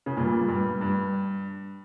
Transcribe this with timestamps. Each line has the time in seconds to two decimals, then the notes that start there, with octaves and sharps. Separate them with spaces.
0.06 C#3
0.17 G2 A#2
0.48 G2
0.81 G2